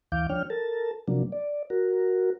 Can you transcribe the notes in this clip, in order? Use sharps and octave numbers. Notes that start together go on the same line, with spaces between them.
D2 E3 F5 D6 G6
F3 D4 C#5 G5 F6
A4 A#4 A5
C3 F3 F#3 A#3 D4
D5
F#4 A#4